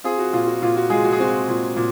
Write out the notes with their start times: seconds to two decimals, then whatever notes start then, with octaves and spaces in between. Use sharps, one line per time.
0.04 C4 F4 G#4
0.18 F#4
0.33 A#2 F4
0.47 F#4
0.62 A#2 F4
0.77 F#4
0.90 G#3 F4 G#4
1.05 F#4
1.12 G#4
1.20 C4 F#4
1.48 A#2
1.77 A#2